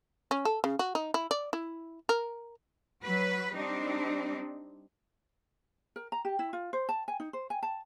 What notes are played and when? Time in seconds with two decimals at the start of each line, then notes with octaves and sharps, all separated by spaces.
0.31 C#4
0.45 A4
0.64 C#3
0.79 F#4
0.95 D#4
1.14 E4
1.31 D5
1.53 E4
2.09 A#4
3.03 F#3 B4
3.54 G3 C4 D4 D#4
5.96 A#4
6.12 A#5
6.25 G4
6.39 E4
6.53 F4
6.73 C5
6.89 A5
7.08 G#5
7.20 D#4
7.33 C5
7.50 G#5
7.63 A5